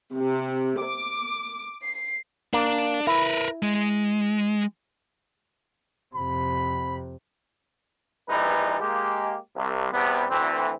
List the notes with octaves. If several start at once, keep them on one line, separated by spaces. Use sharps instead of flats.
C3
D6
C7
A#3 D4
E4 A#4 B4
G#3
F2 C3 B5
A#1 E3 G3 G#3 D#4 B4
G#3 A#3 G4
C2
E2 C3 G3 B3
D2 E3 C4